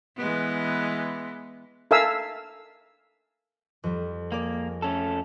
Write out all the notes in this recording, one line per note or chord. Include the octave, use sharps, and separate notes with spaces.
E3 G#3 B3
A4 A#4 E5 F5 G#5 E6
F2 G3
A#3 G#4 D5
A3 C#4 A4